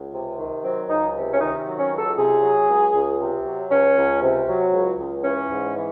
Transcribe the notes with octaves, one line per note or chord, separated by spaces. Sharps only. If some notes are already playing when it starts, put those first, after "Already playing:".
Already playing: C#2
C3
D#3
F#3 C4
C#2 D#4
C3
C#4
D#3 D#4
F#3
C#4
C#2
A4
C3 G#4
F#3
C#2
C#2
C3
F#3
C#2 C#4
C#2
C3
F#3
C#2
C#2
E3 C#4
G#2
E3